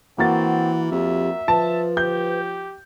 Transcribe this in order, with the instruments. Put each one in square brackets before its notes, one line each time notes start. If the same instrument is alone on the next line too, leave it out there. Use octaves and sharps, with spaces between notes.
[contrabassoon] E3 [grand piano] A#3 F#4 A6 [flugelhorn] C4 [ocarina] F#5
[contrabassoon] F2 [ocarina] G4 [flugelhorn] E5
[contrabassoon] F3 [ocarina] B4 [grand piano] A5
[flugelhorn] G4 [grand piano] G6